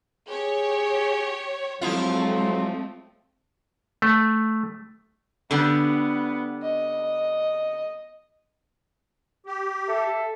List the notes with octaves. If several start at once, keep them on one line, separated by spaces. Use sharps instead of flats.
G4 G#4 C#5
F3 F#3 G#3 A3 C4 E4 F4
A3
D3 G3 B3
D#5
G4
A4 E5